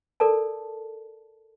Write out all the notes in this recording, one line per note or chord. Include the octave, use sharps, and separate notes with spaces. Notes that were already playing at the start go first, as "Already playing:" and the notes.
A4 A#4 D5 A5